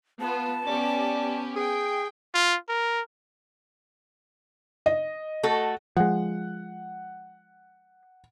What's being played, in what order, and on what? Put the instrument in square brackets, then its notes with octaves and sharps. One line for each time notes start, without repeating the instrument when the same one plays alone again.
[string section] B3 F4 [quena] A5
[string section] B3 C#4 G4 [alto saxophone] D5
[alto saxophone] G#4 [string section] G5
[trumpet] F4
A#4
[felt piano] D#5
[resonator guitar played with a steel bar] A3 F#4 A4
[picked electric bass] F3 G#3 [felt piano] F#5